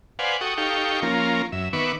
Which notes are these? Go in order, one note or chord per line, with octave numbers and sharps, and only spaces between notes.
B4 C5 D5 F5 F#5 G#5
F#4 A4 G5 C#6 D#6
D#4 G4 A4 F5 G5 C#6
F3 A#3 C#4 F4 A#4
F#2 E5
D#3 B3 B4 E5 C#6 D6